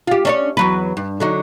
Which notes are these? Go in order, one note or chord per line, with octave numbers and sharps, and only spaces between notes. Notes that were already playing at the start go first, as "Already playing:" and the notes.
F4 G4
C#4 D4 C#5
E2 F#3 B4
G2
D3 F#3 D#4